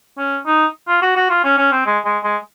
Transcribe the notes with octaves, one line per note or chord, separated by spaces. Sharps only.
C#4
D#4
F4
F#4
F#4
F4
C#4
C#4
C4
G#3
G#3
G#3